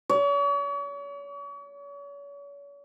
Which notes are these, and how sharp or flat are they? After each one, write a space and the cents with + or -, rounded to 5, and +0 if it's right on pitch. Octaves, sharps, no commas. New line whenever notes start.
C#5 +40